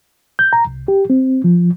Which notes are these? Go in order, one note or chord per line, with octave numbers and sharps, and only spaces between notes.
G6
A#5
C2
G4
C4
F3